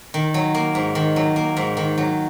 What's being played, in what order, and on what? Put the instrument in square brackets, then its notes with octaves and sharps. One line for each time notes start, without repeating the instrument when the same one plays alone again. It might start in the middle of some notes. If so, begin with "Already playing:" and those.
[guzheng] D#3
F#3
A#3
G#2
D#3
F#3
A#3
G#2
D#3
F#3